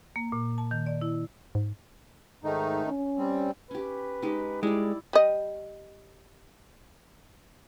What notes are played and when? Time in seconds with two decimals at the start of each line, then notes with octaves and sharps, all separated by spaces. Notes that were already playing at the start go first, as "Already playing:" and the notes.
0.16 A#3
0.32 A#2
0.58 A5
0.71 D#3
0.86 D5
1.01 E4
1.55 G#2
2.44 G#2 D#3 A3 D#4
2.86 C#4
3.18 G3 C4
3.71 C#4 G4 B4
4.22 G#3 D#4 G4
4.63 G3 G#3 E4 D5
5.13 G3 D#5